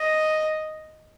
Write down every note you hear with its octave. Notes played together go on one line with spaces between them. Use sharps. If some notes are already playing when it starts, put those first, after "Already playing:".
Already playing: D#5